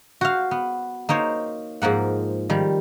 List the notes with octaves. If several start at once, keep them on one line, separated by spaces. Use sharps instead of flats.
F#4 C5 F5
B3
A#3 D#4 C5 C#5
G#2 F3 A#3 F#5
D#3 F3 G3